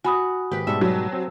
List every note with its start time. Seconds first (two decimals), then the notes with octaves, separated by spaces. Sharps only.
0.04 F#4 G#5 B5 D#6
0.51 G#1 G4 B4
0.67 G#2 B2 G3 A4 E5
0.81 F#3
1.13 C4